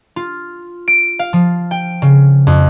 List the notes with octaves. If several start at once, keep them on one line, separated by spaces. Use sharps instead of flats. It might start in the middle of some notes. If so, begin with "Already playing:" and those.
F4
D7
F5
F3
G5
C#3
F2